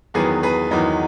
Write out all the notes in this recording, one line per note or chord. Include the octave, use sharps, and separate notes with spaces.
E2 D#3 F#3 B3 G#4 B4
G#4 B4
E2 D#3 F#3 B3 D#4